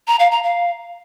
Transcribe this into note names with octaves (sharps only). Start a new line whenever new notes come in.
A#5
F5
A#5
F5